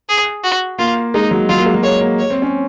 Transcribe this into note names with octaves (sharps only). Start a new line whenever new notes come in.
G#4
F#4
A#3 F4
G#3 D#4
F#3
F#3 F4
A#3
G#3
F#3
G#3 C#5
A#3
C#5
C4
C#4